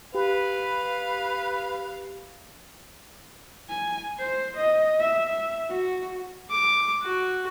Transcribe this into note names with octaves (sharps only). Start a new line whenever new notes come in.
G4 B4 F5
G#5
C5
D#5
E5
E5
F#4
D6
F#4